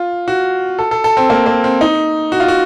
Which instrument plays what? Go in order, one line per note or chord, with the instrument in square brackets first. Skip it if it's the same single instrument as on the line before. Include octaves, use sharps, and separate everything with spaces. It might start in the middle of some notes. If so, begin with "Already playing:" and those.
Already playing: [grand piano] F4
F#4
A4
A4
A4
C4
A#3
A#3
C4
D#4
F#4
F4
F#4